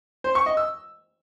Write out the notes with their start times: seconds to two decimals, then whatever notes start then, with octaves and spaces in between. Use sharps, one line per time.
0.24 C5
0.35 C#6
0.46 D#5
0.57 E6